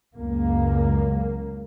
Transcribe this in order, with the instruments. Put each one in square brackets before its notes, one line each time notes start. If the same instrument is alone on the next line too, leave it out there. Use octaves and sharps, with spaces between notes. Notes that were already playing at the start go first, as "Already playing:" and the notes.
[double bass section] C#2 F#2 A#3